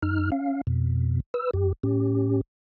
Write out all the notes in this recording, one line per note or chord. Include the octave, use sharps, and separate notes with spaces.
F#2 D#4 F6
C#4 F5
F2 B2
B4 E6
F#2 G4
A2 C#4 G4